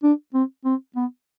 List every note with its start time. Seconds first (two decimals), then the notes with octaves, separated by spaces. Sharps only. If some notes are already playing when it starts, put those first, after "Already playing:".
0.03 D4
0.34 C4
0.65 C4
0.96 B3